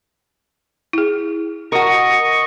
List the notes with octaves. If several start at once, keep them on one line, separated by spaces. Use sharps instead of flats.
E4 G#4
F#4 A#4 D#5 C#6